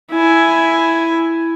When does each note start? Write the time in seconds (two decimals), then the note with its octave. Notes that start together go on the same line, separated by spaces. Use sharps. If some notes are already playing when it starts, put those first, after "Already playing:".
0.11 E4 G#5